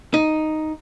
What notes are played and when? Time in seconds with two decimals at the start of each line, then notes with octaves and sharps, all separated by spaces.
0.14 D#4